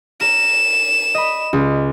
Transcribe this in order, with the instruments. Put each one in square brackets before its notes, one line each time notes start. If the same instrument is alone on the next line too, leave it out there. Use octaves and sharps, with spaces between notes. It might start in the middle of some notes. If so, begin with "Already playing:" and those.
[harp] A#4 [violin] E7
[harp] D#5 B5
C#2